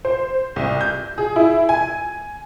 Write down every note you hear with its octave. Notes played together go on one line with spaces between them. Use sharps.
C5
C2
G6
G#4
E4
G#5